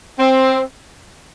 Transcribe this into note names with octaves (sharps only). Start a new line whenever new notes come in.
C4